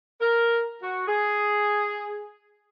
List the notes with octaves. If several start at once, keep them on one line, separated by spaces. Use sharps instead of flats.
A#4
F#4
G#4